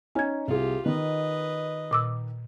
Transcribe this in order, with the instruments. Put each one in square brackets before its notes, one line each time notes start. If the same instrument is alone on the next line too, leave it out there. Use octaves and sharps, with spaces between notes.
[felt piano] C#4 D#4 [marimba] G#5 G#6
[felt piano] C2 G#4 [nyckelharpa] F4 G4
[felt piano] D#3 [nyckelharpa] B4 D#5
[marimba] A#2 D6 E6